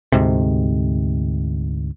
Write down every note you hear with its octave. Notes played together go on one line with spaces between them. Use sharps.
D2 G#2 C3